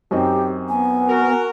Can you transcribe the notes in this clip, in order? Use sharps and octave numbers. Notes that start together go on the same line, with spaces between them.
F#2 C4 D#4 G4
B3 G#5
F#4 A#4